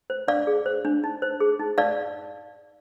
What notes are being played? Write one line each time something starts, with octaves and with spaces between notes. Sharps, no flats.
C5
D4 D5 F5
G#4
C5
D4
D#4
C5
G#4
D#4
D#4 D5 F5